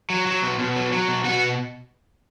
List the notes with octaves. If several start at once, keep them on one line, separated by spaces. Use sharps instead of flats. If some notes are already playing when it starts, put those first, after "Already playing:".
F#3
F#3
B2
B2
F#3
F#3
B2
B2 F#4 F#5